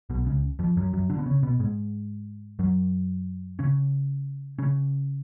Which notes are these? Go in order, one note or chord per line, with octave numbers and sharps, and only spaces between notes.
B1 B2
C#2 C#3
F2 F3
F#2 F#3
F#2 F#3
D3 D4
B3
C#3 C#4
B2 B3
G#2 G#3
F#2 F#3
C#3 C#4
C#3 C#4